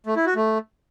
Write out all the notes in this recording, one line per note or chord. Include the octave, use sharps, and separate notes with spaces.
A3
E4
F#4
A3